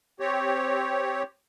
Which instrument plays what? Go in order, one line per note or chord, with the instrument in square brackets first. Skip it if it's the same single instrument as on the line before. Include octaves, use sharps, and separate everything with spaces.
[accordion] C4 G4 C#5